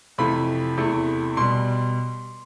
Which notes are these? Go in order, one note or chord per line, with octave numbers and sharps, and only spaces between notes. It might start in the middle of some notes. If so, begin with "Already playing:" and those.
F2 C3 E3 A3 B5
E2 C3 E3 A3
B2 G3 C6